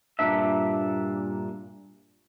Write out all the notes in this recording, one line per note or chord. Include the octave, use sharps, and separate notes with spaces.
G2 A#2 D3 A#3 D4 E5